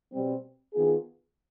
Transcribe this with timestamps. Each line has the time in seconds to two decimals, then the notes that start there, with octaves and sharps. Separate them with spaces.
0.13 B2 G3 C4
0.74 D#3 B3 F4 G#4